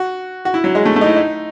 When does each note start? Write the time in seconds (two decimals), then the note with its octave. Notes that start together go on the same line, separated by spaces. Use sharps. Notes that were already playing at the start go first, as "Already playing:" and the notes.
Already playing: F#4
0.45 F#4
0.54 E4
0.64 F#3
0.75 G#3
0.85 A3
0.96 A3
1.01 D#4
1.06 E4
1.16 D#4